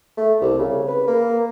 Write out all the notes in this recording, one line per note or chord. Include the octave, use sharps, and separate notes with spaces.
A3
C2
C#3
B4
A#3